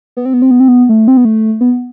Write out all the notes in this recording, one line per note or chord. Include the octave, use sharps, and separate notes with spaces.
B3
C4
B3
C4
B3
C4
B3
A3
C4
B3
A3
B3